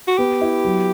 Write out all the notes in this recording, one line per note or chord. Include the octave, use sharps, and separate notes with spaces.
F#4
B3 G4
E4
F#3